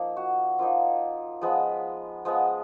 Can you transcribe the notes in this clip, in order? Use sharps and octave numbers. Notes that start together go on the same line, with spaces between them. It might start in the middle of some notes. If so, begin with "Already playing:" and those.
Already playing: F3 A#3 D#4
F#4
F3 A#3 D#4 F4
F3 G#3 B3
F3 G#3 B3